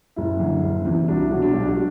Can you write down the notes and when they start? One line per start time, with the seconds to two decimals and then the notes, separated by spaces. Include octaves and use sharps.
0.16 F#1 E4
0.40 F#2 D3
0.63 F#1
0.85 E2 C3 E3
1.08 C2 D4 F#4
1.20 E4
1.30 B2 F#3 D4 F#4
1.41 D4 F#4
1.53 B1 D4 F#4
1.64 G4
1.68 D4 F#4